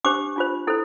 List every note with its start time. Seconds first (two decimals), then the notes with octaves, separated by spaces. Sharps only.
0.05 D4 G4 C5 D6
0.36 D4 F4 C5
0.67 E4 A4 C5